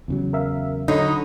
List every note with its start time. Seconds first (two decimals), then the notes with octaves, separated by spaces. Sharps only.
0.08 E2 C#3 F#3
0.33 A#4 E5 F5
0.88 D3 F#3 D#4 C#5 B5